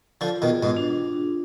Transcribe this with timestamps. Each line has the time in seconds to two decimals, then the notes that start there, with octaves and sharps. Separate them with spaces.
0.21 D3 F3 F4
0.42 B2 D#3
0.49 G#4
0.63 G#2 B2
0.77 D4